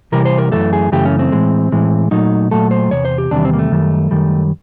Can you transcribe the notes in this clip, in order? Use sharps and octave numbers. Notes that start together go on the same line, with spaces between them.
C3 E3 G3 A#4
C5
A#4
F#2 C#3 E3 A3 A4
G#4
F#2 C#3 E3 A3 G4
C#4
C4
A2 E3 G#3
A2 E3 G#3
A#2 F#3 A3 D#4
A#2 F#3 A3 A4
C5
E2 C3 C#5
C5
G4
E2 C3 D#3 G3 D4
C4
A#3
A3
F#2 D#3 G3
F#2 D#3 G3